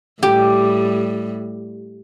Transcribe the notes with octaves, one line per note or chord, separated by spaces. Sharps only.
A2 G3 G4